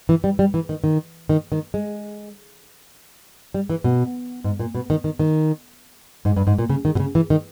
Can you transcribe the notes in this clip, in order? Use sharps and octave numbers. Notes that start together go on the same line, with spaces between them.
E3
G3
G3
E3
D#3
D#3
D#3
D#3
G#3
G3
E3
B2
G#2
A#2
B2
D#3
D#3
D#3
G#2
G2
G#2
A#2
C#3
D#3
B2
C#3
E3
D#3